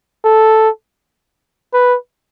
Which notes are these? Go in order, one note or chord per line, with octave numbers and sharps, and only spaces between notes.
A4
B4